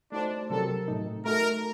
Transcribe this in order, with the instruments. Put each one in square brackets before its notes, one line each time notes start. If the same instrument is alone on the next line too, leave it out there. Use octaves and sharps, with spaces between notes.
[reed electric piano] A3 D#4 F#4 C5 [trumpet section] D4
[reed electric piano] C3 F#3 C4 G4 A#4 [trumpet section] A4
[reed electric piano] A2 A3 D#4
[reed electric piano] A3 D#4 F#4 [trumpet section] A#4